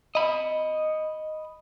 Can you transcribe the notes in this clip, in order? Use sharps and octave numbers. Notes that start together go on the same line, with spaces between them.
D#5 B5